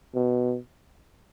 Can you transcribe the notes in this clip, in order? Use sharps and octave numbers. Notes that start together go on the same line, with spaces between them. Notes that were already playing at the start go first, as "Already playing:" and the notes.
B2